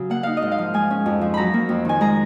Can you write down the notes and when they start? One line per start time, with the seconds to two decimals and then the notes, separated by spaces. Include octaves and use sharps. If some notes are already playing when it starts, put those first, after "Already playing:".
Already playing: C#3 F#3 F#4
0.10 A#3 F#5
0.23 D#4 F5
0.37 D#5
0.42 G#2
0.52 F5
0.58 F3
0.74 G#3 G#5
0.90 C#4
1.06 F2
1.21 F3
1.34 F#3 A#5 B5
1.54 A#3
1.69 F2
1.85 D#3 G#5
2.01 G#3 A#5